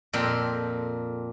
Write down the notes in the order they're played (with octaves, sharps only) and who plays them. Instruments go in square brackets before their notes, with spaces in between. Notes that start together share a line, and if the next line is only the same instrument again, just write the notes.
[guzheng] F2 A#2 A4 A#4 G5 C6